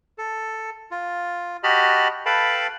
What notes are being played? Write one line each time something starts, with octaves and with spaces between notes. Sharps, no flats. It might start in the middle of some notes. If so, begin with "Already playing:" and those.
A4
F4
F#4 G4 D#5 A5 B5 F6
A4 B4 F5 G5 A5 B5